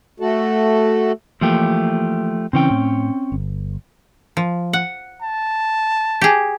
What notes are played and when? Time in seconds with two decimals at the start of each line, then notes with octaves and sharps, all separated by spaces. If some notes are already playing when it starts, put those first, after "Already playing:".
0.20 A3 F#4 A4
1.41 E3 F3 A3 A#3 G4
2.53 C#3 E3 C4 C#4 G5
2.70 A2
3.32 G1
4.37 F3
4.73 F#5
5.22 A5
6.21 G4 G#4